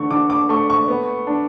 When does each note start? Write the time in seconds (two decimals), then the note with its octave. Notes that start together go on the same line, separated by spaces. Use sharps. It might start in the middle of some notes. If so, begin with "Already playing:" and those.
Already playing: D3 A3 C#6
0.11 D3 D6
0.30 D6
0.49 A3 C#6
0.70 C#6
0.88 B3
1.27 D4